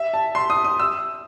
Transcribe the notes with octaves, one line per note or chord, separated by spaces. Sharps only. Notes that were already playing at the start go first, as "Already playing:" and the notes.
Already playing: E5
A5
C6
D#6
D#6
E6